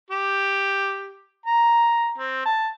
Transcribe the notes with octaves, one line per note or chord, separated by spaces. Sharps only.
G4
A#5
C4
A5